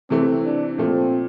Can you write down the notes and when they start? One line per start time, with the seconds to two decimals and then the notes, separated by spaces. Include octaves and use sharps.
0.10 C3 E3 A3 C4
0.45 D4
0.78 A#2 F3 A3 C4